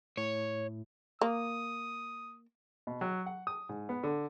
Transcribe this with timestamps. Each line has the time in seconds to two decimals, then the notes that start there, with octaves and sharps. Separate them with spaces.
0.17 A2 C#5
1.21 A#3 D#6
2.87 B2
3.01 F#3
3.26 F#5
3.47 D#6
3.69 G#2
3.89 B3
4.03 D3